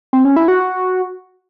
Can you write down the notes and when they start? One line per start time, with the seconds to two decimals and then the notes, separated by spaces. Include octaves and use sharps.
0.13 C4
0.25 C#4
0.36 E4
0.48 F#4
0.60 F#4